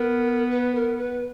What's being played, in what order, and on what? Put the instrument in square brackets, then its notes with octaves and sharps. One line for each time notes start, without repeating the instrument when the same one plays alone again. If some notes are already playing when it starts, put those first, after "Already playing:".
Already playing: [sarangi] B3 [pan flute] A#4
[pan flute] B4
A#4
B4